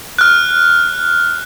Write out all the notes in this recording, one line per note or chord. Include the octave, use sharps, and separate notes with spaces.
F6 F#6